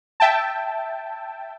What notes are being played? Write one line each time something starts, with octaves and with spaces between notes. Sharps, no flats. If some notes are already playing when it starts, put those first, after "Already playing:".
E5 G5 A5